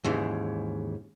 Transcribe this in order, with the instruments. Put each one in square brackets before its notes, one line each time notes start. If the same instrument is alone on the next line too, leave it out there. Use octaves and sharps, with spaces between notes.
[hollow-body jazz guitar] D#2 G#2 C#3 E3